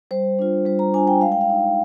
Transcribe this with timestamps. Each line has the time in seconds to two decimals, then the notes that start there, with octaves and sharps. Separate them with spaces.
0.11 G3 C5
0.39 D4 F4
0.65 G3 C5
0.79 A#5
0.94 D4 F4 G#5
1.08 G5
1.21 G#3 F5
1.32 G5
1.41 F5
1.49 D#4